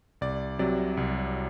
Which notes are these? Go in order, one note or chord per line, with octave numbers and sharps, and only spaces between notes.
C2 D5
C3 F#3 D5
C2